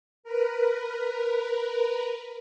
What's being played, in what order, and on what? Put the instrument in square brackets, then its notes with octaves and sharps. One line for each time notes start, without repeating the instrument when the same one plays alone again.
[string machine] A#4 B4